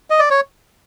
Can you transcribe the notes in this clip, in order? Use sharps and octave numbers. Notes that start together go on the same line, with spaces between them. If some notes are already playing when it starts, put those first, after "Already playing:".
D#5
D5
C#5